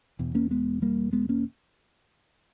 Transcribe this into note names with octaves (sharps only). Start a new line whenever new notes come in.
E1 E2 B2
A#3 C#4
G#3 B3
G3 A#3
G#3 B3
A#3 C#4